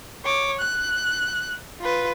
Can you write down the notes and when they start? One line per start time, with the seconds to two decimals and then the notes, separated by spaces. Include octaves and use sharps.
0.24 C#5 D6
0.59 F#6
1.80 F4 B4